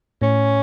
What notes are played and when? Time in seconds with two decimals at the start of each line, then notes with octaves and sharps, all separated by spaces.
0.22 A2 C#4